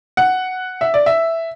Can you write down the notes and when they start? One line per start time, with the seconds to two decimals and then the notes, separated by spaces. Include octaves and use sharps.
0.17 F#5
0.81 E5
0.94 D5
1.06 E5